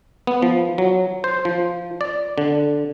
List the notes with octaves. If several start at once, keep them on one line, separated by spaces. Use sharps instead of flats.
B3
F3
F#3
C5
F3
D5
D3